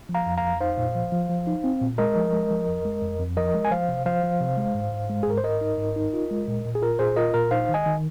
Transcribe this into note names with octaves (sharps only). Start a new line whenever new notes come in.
F3
F5 A#5
F2
F5 A#5
F2
D#4 C5 F5
A#2
F3
F3
F3
D#4
C4
A#2
G#3 A#4 D#5
F3
G#3
F3
F2
G#3
F2
F2
F3 A#4 D#5
G#3
G#5
F3 C5 F5
C3
F3 C5 F5
F3
C3
G#3
G#2
G#2
G#3
G#4
G#2 A#4
C5
G#2 A#4 D#5
D#4
G#2
D#4
F4
G#3
A#2
A#2
G#4
F4 A#4
A#2 G#4 C5
F4 A#4 D#5
A#2 A#4
D#4 C5 F5
D#3
D#5 G#5
D#3